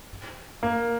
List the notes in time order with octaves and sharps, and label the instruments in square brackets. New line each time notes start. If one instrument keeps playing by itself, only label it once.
[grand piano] A#3